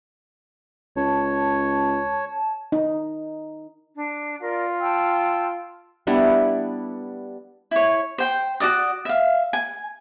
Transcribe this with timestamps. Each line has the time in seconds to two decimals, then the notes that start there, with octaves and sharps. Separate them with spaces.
0.96 C#2 C#5 A5
2.72 D#4
3.95 D4
4.42 F4 A#4 D5
4.81 G5 A5 E6
6.07 G3 B3 D4 E4
7.71 E4 C#5
8.18 C5 G5
8.60 F#4 A#4 D5 D#6
9.05 E5 F5
9.53 G#5